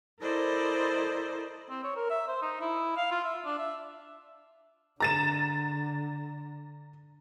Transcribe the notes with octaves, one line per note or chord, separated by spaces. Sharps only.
E4 A4 A#4 C5 D5 D#5
C4
C#5
A#4
E5
C5
D#4
E4
F5
F4
E5
D4
E5
D3 A#5 A6 E7